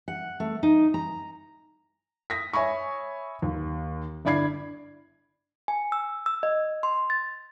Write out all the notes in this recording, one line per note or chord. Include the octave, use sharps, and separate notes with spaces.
F#5
A3
D#4
A#5
D#6 A#6 B6
C#5 E5 G#5 B5 C#6
D#2
G1 E4 D5 B5 G#6 C7
G#5
E6
E6
D#5
C6
A6